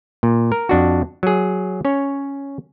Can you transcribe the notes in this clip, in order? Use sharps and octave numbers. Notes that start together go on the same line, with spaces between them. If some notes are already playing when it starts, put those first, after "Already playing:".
A#2
A#4
F2 D4 F#4
F#3 G#4
C#4 C#5